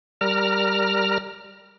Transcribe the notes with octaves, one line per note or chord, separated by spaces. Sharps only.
G3 A#4 A#5 F6